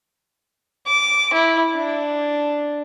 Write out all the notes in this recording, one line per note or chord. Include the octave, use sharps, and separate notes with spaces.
D6
E4
D4